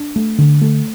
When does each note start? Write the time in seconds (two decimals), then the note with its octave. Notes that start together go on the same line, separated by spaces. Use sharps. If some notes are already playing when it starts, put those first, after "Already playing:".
Already playing: D4
0.16 A3
0.38 D3
0.62 A3